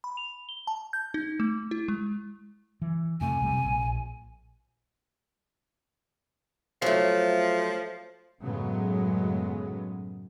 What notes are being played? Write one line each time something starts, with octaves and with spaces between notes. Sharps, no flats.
B5
F7
G7
A5
G6
D#4
A3
E4
G#3
E3
F2 C3 A3 G#5
B1 C3 G3
A#1
F3 F#3 A3
F#2 A2 C#3 F#3 G#3 B3